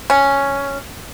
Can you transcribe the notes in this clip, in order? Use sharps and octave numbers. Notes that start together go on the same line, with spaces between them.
C#4